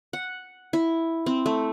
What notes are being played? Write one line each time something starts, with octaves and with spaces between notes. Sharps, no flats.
F#5
E4
C4
A3